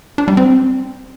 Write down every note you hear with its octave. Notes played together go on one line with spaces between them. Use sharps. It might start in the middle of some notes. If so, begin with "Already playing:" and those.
D4
G3
C4